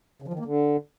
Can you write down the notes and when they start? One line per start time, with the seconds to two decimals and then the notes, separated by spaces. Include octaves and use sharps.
0.22 C#3
0.28 F3
0.34 D#3
0.39 A#3
0.45 D3